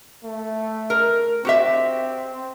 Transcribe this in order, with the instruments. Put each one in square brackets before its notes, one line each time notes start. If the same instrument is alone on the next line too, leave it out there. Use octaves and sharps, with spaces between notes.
[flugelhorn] A3
[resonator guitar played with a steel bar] A#4
[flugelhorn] C4 [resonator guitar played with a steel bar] F#4 G4 E5